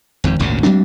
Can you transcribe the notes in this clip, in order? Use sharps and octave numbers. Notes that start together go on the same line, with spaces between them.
G#1 F2 G#2
G#1 D2 A#2 C#3
F#3 G#3 C4 D4